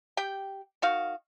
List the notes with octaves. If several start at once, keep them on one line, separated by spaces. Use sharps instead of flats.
G4 G5
D#3 F#4 F5